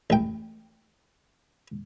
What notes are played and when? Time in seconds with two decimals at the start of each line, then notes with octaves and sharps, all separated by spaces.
0.10 A1 G5